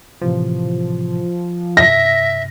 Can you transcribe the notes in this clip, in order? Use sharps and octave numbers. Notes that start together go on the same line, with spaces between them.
A2 C3 E3 F3
G2 C3 E5 A#6